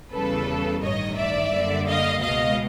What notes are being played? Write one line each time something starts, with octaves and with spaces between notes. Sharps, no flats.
E2 C#3 E3 G3 A4 B4
A1 G2 D#3 C#5 D#5
D5 E5
F#2 D3 G3 A#3
D#5 F5
C#2 B2 G#3 D#5 F5